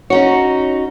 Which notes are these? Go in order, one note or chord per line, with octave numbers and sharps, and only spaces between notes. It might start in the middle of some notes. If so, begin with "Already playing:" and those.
C#4 D#4 F#4 C#5